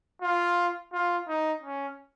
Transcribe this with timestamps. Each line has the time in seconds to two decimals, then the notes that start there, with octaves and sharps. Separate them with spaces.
0.22 F4
0.93 F4
1.28 D#4
1.62 C#4